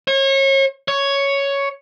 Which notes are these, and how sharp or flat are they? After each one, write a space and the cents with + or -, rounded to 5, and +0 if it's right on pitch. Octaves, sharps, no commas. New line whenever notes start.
C#5 -35
C#5 +5